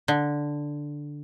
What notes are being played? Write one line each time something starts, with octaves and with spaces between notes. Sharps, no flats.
D3